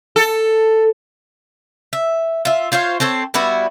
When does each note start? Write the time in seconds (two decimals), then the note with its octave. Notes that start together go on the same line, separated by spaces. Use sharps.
0.16 A4
1.93 E5
2.45 F4 E5
2.72 F4 C5 C#5 F5
3.00 C4 A4 C5 C#5
3.34 G3 B3 E4 F#4